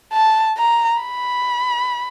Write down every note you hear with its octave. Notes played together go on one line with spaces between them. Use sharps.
A5
A#5
B5